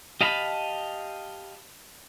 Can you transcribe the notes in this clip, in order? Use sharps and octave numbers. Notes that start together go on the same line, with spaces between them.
G4 D#5 F5 A5 B5